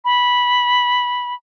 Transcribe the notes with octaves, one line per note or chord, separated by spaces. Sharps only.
B5